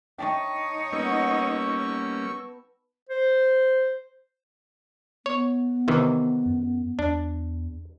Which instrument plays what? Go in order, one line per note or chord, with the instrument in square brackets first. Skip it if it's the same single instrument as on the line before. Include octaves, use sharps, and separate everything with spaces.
[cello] D#4 C#5 [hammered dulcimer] G5 A5 C#6
[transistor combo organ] G3 A#3 C#4 [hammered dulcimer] B3 [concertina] C#6 E6
[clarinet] C5
[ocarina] B3 [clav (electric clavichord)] C#5
[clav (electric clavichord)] C3 D#3 E3
[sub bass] F#2
[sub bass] E2 [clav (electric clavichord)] D4